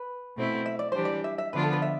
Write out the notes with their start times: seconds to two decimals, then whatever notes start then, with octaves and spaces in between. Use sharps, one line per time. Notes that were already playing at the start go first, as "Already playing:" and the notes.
Already playing: B4
0.37 B2 A3 C4 E4
0.66 E5
0.79 D5
0.92 E3 G3 D4 G4 C5
1.05 D5
1.24 E5
1.38 E5
1.53 D3 F3 B3 D4 F4 B4
1.63 A4
1.73 B4
1.82 E5